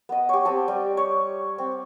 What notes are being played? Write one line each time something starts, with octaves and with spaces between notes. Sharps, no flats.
B3 D#5
G4 C#5
C4 G4 A5
G3 G5
C#5
C4